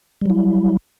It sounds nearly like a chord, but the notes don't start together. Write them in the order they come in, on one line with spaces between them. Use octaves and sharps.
G3 F#3 E4